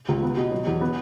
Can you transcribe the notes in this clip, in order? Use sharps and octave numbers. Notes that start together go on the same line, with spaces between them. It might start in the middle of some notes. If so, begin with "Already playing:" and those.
C#2
B3
B2
F#3
E2
B3